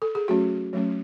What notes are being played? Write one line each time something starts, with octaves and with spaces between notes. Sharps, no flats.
A4
G#4
F#3 A3 C#4 F#4
F#3 A3 C#4